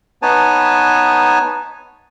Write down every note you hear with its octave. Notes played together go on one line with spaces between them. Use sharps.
B3 D#4 B4 C#5 G#5 A5